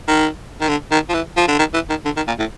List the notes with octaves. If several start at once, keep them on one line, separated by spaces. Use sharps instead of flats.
D#3
D#3
D3
D#3
F3
E3
F3
D3
D#3
E3
D#3
D3
D#3
A#2
A2